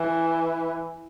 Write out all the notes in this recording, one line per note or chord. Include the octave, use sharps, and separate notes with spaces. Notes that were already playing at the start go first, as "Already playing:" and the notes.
Already playing: E3